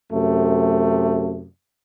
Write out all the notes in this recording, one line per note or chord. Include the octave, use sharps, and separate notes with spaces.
F#2 C3 A3